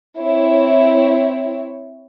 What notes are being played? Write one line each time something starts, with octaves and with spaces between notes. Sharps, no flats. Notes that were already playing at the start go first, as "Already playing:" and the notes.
C4 E4 C#5